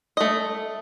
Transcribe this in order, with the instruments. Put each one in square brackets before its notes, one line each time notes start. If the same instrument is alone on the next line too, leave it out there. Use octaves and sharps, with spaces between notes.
[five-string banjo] A3 D#5